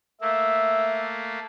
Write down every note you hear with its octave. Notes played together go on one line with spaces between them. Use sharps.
A3 A#3 E5